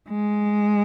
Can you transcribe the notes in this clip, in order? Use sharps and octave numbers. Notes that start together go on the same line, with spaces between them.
G#3